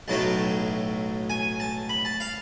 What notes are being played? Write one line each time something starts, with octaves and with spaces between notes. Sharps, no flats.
B1 A2 F#3 A3 A5
G#5
A5
B5
A5
F5